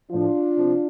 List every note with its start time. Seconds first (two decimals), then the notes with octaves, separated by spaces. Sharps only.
0.11 A2 F3 D4 F4
0.57 C3 F3